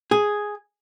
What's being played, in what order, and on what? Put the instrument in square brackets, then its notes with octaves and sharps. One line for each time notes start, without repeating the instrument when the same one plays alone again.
[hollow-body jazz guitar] G#4